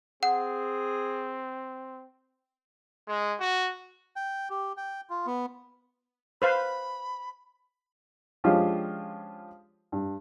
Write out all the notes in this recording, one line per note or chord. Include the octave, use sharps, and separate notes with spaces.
C4 G#4 F#5
G#3
F#4
G5
G4
G5
F4
B3
B4 C5 F5 B5
F3 G#3 C#4 D4 F4 G4
G2